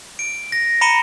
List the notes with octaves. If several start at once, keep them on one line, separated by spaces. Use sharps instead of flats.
D7
A#6
A#5 B5 C#7 D#7 E7 G7